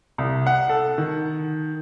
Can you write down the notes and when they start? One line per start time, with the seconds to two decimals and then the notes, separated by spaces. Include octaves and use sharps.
0.18 C2
0.47 F#5
0.69 A4
0.98 D#3